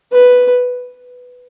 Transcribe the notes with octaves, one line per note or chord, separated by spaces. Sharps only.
B4